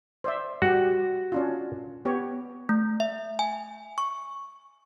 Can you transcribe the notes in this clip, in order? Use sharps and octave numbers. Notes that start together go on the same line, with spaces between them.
C5 D5 E5
G3 F#4 G4
C#4 D4 F4
B3 G4 C#5
A3
E5
G#5
C#6